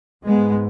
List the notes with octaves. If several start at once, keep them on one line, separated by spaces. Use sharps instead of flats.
G#2 G#3 B3